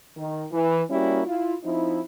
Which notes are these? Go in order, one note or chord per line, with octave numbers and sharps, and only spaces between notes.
D#3
E3
G3 A#3 C#4 E4 F#4
E4 F4
F3 C4 D#4 E4